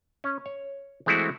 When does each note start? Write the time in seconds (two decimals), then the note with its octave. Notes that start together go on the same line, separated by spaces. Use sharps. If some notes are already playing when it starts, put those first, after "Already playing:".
0.24 C#4
0.46 C#5
1.06 E3 G#3 A3 C4 E4 F#4